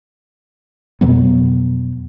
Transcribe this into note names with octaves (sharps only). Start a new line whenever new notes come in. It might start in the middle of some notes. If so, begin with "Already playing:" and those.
F2 B2 F#3 B3